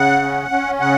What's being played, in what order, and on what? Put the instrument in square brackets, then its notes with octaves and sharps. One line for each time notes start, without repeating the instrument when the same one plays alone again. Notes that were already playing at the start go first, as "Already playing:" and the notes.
Already playing: [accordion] C#3 F#5
C#4
C#4
C#3 F#5